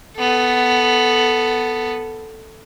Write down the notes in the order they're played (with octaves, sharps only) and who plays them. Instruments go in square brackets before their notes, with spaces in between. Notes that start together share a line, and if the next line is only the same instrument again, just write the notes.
[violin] B3 A4